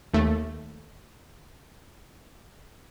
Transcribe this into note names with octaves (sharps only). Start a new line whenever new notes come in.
D#2 A3